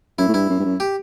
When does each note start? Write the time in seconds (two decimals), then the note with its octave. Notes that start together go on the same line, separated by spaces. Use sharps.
0.19 F#2 E4
0.29 A2
0.34 G2 E4
0.49 F#2
0.60 G2
0.65 F#2
0.80 G4